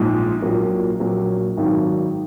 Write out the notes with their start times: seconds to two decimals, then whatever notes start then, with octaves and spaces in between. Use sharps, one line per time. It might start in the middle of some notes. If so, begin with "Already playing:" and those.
Already playing: A#1 G#2 F3 G#3
0.42 A#1 A#2 F#3 A#3
1.00 A#1 A#2 F#3 A#3
1.57 G#1 G#2 D#3 F#3